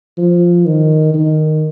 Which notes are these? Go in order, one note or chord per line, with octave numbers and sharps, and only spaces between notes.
F3
D#3
D#3